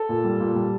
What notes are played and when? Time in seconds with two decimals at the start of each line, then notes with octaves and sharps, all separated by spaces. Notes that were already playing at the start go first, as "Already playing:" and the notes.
Already playing: A4
0.09 A#2
0.24 G3
0.40 A#2
0.56 G3